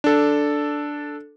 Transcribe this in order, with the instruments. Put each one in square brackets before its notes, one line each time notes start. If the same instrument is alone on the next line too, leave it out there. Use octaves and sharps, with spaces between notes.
[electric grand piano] D4 A4